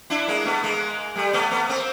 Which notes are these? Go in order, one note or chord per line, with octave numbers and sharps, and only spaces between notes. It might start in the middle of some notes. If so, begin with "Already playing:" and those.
D4 E4
G#3 A#3
A3 B3
G#3 A#3
G3 A3
A3 B3
A3 B3
A#3 C4